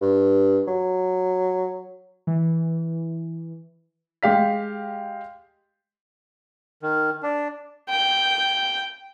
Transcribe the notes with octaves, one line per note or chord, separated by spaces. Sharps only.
G2
F#3
E3
G#3 G4 F5 B6
D#3
D4
G5